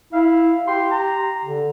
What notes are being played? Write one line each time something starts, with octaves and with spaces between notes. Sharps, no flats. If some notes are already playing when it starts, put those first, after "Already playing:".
E4 F5
G4 C6
A#5
D3